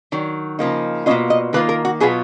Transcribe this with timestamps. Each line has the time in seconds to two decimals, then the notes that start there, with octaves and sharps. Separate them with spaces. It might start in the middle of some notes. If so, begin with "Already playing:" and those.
0.12 D#3 F#3
0.59 C#3 F3 A#3 D#4
1.06 B2 A#3 C#4 F4 D#5
1.30 D#5
1.53 D#3 A#3 F4 B4
1.69 A#4
1.85 F#4
2.00 B2 F#3 B3 F4 G#4